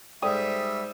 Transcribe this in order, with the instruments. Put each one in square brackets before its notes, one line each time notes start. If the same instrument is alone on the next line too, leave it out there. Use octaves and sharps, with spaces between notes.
[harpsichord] G#2 [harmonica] G3 E5 [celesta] A4 D5 G5 [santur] D#6